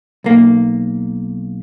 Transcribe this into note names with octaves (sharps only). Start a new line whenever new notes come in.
B1 A#3